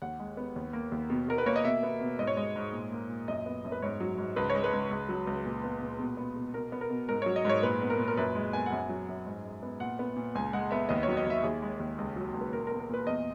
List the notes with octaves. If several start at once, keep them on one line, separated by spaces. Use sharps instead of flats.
D#2 F#5
G#3
B3
D#2
A#3
D#2
B2
B2 A#4
B4
A#3 C#5
D#5
B2 E5
B3
B2
G#2 D#5
C#5
G#3 D#5
G#2
A#2
A#3
A#2
F#2 D#5
B3
F#2
B4
G#2 C#5
F#3
G#2
C#2 B4
C#5
G#3
B4
C#2
C#2
F#3
C#2
A#2
B3
A#2
B2
B3
B2
B2 A#4
B3
A#4
B2
G#2 A#4
F#3 C#5
D#5
G#2 C#5
A#2 B4
B3
A#4
A#2
A#4
F#2 B4
G#3
B3 G#5
F#5
F#2
G#5
F#3
F#2
G#2
G#3
B3
A#2 F#5
B3
A#2
C#2 G#5
G#3 F#5
B3 E5
D#2 D#5
F#3 C#5
D#5
D#2 E5
D#2 G#4
G#3
D#2
C#2
F#3
C#2
B4
A#2 A#4
A#4
B3
A#4
A#2 B4
E2 D#5